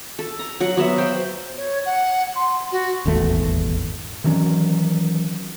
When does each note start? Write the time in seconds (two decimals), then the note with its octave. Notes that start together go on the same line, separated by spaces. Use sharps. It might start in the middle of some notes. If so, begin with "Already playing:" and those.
0.19 A4
0.39 A#5
0.60 F#3 F#5
0.77 F#3 B3 E5
0.98 C5 F5 G5
1.57 C#5
1.86 F#5
2.36 C6
2.72 F#4
3.06 D#1 G#1 E2 A3
4.24 D#3 E3 F#3 C#4